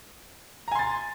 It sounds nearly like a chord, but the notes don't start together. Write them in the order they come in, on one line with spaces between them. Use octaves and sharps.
A#5 G#5 C6 A6